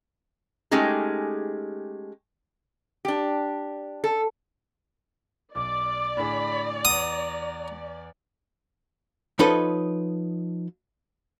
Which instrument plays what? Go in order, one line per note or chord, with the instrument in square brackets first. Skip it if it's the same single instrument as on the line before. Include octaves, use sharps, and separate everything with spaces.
[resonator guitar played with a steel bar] G#3 A3 C#4 D#4 G4 G#4
D4 G4
A4
[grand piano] B1 [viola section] D5 [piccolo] D6
[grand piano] A2 D3 G#4 [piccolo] B5
[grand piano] E2 F#5 [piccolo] A#5 [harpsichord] D#6
[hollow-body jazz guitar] F3 D#4 A4 B4 C#5 D#5